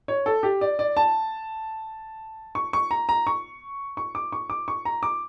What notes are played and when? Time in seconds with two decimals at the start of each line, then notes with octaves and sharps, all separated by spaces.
0.08 C#5
0.26 A4
0.43 G4
0.61 D5
0.79 D5
0.97 A5
2.55 C#6
2.73 C#6
2.91 A#5
3.09 A#5
3.27 C#6
3.97 C#6
4.15 D6
4.32 C#6
4.50 D6
4.68 C#6
4.85 A#5
5.03 D6